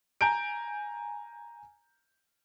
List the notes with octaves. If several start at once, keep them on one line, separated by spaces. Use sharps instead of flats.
G#5 A#5 G6 D7